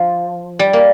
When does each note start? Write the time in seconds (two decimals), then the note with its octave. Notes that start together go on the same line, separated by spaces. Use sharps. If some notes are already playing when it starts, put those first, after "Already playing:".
Already playing: F3
0.59 G3
0.73 A#3